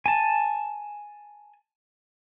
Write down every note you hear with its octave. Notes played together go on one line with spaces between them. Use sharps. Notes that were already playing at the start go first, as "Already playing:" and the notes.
G#5 A5